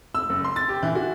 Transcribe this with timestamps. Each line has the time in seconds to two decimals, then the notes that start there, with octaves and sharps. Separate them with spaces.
0.15 E6
0.29 F#1
0.44 C6
0.56 A6
0.68 G4
0.83 E3
0.95 F#4